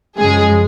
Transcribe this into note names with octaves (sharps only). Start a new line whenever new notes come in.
F#2 C#3 F3 G#3 G#4